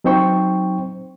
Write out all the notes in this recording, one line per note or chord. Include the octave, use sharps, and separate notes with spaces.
F#3 C4 D#4 C5 G5 C#6